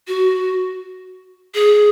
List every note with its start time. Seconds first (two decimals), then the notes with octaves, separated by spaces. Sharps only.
0.08 F#4
1.54 G#4